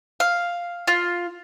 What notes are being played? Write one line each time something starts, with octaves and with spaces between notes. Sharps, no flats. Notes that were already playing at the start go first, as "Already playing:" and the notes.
F5
F4